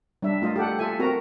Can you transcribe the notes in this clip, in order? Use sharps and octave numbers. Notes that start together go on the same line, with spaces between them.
G3 D4 E5
A3 F4 D#5
G4 A4 F#5
F4 A4 E5 G#5
C4 F#4 A#4 A#5